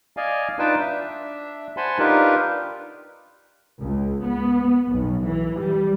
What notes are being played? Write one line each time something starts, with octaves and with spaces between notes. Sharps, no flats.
D5 D#5 F5 G#5
D4 D#4 F4 B4 G5 A5
D4 E5
C5 F#5 G#5 A5 B5 C6
D4 D#4 F4 G4 A#4 B4
C#2
B3
B1
E3
G3